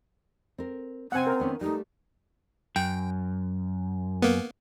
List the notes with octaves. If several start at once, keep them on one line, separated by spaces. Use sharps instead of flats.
C4 A#4
C3 C4 C#4 F#5 G#5
A#4
D#3 B3 C#4
G3 A3 D#4
F#2 G5
A#3 B3